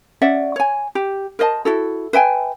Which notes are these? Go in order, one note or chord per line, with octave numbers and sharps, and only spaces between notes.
C#4 D5 E5 F#5
C#5 G#5
G4
A#4 C5 D#5 A5
E4 F#4 A4
B4 E5 G5 G#5